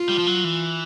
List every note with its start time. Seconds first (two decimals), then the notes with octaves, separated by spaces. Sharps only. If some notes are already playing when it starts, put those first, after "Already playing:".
Already playing: F4
0.09 G3
0.19 F3
0.27 F#3
0.44 E3